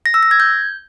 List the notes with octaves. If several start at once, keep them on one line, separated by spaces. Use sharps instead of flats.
A#6
E6
A#6
G#6
G6